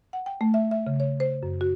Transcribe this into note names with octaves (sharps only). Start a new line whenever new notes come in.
F#5
G5
A3
E5
E5
C#3
C#5
C5
F#2
F#4